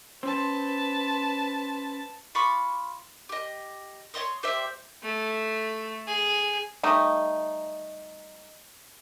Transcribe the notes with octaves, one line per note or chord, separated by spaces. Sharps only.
C#4 B4 C5 A5
F4 B5 C#6 D6
G4 D#5
C#5 D#5 C6 D#6
G4 C5 D5 E5
A3
G#4
G3 A3 D#4